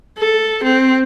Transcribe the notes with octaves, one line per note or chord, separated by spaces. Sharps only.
A4
C4